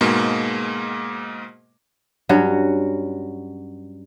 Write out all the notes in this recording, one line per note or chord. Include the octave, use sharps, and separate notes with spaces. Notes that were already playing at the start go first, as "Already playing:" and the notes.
G#2 B2 G#3 A#3
G2 F#3 C#4 F#4